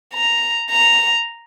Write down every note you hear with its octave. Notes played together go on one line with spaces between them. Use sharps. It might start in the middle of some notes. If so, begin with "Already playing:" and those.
A#5
A#5